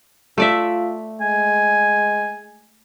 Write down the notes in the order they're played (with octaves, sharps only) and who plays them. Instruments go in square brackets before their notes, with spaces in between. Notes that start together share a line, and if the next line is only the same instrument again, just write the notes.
[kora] A3 D5 E5 [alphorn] F4
[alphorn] G#3 [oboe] G#5